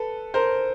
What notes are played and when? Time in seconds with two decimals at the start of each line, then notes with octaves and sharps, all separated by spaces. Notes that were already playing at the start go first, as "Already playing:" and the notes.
Already playing: A4 B4
0.34 A#4 C5